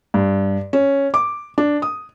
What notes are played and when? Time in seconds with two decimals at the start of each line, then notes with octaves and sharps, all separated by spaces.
0.14 G2
0.73 C#4
1.14 D6
1.58 D4
1.82 D#6